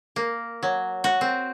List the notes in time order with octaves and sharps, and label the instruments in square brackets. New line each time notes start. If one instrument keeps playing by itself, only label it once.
[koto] A#3
F#3
F#4
C4